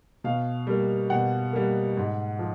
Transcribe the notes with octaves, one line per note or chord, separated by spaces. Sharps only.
B2 F5
G3 A#3
B2 F#5
G3 A#3
G#2
F3